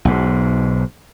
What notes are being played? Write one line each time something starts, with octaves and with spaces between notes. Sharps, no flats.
B1 G#2